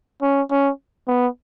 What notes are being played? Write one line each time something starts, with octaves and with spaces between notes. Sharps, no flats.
C#4
C#4
B3